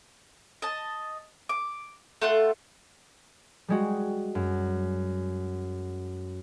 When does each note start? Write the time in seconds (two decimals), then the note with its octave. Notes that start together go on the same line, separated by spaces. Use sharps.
0.62 D#5 A5
1.49 D6
2.22 A3 F4 F#5
3.68 G3 G#3 F#4
4.35 F#2